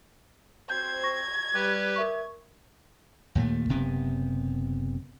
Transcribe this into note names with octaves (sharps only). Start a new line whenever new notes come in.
C4 F#4 C5 G6 G#6
C#6 A#6
G3 G4 B4
A#4 E5 C#6
D#2 A#2 G#3 A3
F#1 C3 B3